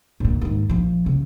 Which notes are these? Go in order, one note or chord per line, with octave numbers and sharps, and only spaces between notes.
A#1 A#2
D#2 G#2
A#1 F3
C#3